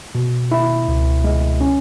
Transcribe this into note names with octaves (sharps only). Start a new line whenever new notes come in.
B2
E4
C#2
G#3
C#4